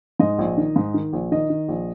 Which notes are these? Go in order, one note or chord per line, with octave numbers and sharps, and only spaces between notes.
G#2 D#5
A#1
D#3
G#2
D#3
A#1
D#3 D#5
D#3
A#1